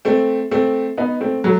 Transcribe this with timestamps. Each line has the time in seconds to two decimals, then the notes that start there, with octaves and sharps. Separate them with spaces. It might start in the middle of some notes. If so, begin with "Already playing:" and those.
0.05 A3 C4
0.51 A3 C4
0.98 B3 D#4
1.21 A3 C4
1.44 F#3 A3